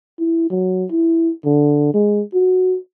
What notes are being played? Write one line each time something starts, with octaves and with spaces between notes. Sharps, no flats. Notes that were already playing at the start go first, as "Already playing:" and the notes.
E4
F#3
E4
D3
G#3
F#4